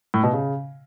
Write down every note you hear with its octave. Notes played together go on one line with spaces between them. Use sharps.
A2
B2
C#3